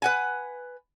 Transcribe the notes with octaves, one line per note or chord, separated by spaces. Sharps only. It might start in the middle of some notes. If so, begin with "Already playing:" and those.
B4 F#5 G#5